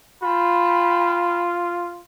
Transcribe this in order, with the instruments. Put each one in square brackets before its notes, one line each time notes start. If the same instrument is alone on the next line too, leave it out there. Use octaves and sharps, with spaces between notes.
[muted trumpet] F4 [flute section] G5 A5 B5